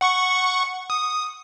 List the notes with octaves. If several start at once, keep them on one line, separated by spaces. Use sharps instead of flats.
F#5 C#6 C#7
D#6